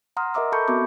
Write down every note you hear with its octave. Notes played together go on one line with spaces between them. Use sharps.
F#5 A#5 C6 D#6 F6
A#4 D#5 E5 A#5 D6 E6
A4 A5 B5 C#6 G6 C#7
B3 C4 F#4 E5 D6